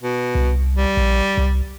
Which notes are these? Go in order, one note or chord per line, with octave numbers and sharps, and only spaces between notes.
B2
C2
G3
A#1
C2